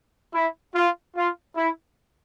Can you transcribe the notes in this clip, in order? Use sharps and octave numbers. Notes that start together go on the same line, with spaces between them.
E4
F4
F4
E4